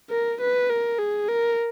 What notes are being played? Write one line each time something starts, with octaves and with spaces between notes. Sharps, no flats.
A#4
B4
A#4
G#4
A#4